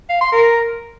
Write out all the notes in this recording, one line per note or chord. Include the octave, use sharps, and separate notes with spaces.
F5
C6
A#4